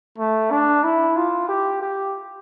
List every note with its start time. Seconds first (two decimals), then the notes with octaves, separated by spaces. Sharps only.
0.18 A3
0.51 D4
0.84 E4
1.17 F4
1.49 G4
1.82 G4